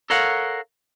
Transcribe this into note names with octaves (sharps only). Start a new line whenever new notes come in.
A4 A#4 C#5 F5 F#5